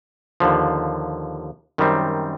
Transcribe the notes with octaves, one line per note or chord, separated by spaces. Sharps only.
D#2 D3 F3
F#2 D#3 G3 C4